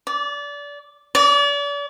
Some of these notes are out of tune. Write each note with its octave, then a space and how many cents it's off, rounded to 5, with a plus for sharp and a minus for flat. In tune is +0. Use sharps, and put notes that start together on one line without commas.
D5 -25
D5 -40